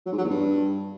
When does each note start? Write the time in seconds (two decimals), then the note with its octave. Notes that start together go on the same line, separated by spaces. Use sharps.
0.06 F#3
0.12 G#2
0.18 F#3
0.24 E2
0.30 G2